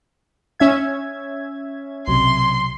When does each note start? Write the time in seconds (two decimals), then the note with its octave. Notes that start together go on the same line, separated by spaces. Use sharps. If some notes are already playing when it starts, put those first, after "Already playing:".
0.59 C#4 E5 G#6
2.08 B1 C3 F#3 C6